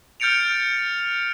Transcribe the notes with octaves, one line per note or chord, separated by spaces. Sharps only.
F6 G6 A6 C#7 D7 F7